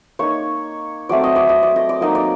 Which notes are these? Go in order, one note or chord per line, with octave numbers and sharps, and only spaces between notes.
A#3 D#4 C#5
F#3 A3 C4 D5
D#5
D5
D#5
D5
D#5
D5
F#3 A#3 D#4 D#5
D5